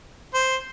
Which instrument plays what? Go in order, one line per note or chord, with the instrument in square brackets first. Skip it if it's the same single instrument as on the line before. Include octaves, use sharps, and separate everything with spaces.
[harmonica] C5